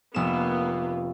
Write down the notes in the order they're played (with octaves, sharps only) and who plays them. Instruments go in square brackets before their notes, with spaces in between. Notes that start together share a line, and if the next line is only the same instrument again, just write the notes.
[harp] F1 E7 [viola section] A#3 B3